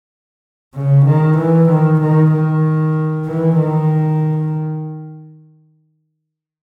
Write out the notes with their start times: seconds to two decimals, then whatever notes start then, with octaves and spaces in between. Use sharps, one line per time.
0.75 C#3
1.06 D#3
1.37 E3
1.69 D#3
2.01 D#3
2.32 D#3
3.26 E3
3.59 D#3